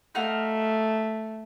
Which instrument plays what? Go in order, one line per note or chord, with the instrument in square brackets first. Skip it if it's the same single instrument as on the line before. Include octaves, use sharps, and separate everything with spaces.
[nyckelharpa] A3 [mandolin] D#4 F#4 F5